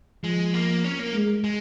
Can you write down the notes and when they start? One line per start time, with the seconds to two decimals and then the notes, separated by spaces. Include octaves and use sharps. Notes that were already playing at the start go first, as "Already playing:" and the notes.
0.23 F3 G#3
0.54 A#3
0.84 C#4
0.99 A#3
1.13 G#3
1.44 G#3